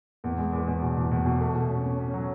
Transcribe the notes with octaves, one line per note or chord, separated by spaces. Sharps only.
E2
G#3
E2
E2
B2
E2
E2
B2
A3
B2
C#4
C#4
C#4
F#3